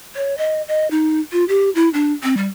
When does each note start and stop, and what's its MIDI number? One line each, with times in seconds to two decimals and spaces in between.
0.16 0.35 73
0.38 0.62 75
0.68 0.89 75
0.91 1.20 63
1.32 1.44 65
1.48 1.70 67
1.75 1.89 64
1.94 2.13 62
2.23 2.35 60
2.37 2.48 55